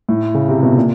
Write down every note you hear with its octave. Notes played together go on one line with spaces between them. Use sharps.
A2
C#3
C3
B2
A#2